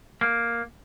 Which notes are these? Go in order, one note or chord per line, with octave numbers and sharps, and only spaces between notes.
A#3